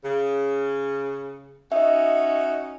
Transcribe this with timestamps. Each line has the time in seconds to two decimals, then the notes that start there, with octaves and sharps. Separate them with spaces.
0.04 C#3
1.72 C#4 D#4 F#4 D#5 E5